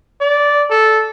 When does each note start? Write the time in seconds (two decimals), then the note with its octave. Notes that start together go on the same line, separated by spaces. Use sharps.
0.21 D5
0.70 A4